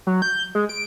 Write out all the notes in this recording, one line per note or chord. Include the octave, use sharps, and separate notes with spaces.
F#3
G6
G#3
D7